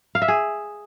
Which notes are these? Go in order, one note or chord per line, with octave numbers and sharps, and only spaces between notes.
F5
E5
G#4